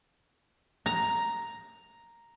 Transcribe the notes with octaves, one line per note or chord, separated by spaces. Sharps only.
A#5